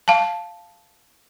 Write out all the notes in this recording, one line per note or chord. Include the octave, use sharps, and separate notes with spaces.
F5 A5